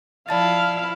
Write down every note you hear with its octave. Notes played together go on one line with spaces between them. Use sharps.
F3 E4 D5 F5 A5 A6